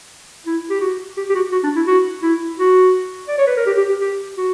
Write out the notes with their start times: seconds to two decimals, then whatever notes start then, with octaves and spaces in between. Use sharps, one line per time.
0.46 E4
0.70 G4
0.80 F#4
1.17 G4
1.29 G4
1.35 F#4
1.52 F#4
1.63 D4
1.76 E4
1.87 F#4
2.23 E4
2.59 F#4
3.28 D5
3.38 C#5
3.47 B4
3.57 A#4
3.66 G4
3.77 G4
3.89 G4
4.01 G4
4.37 F#4